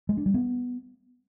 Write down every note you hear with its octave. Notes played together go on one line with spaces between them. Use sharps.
G#3
D4
G3
B3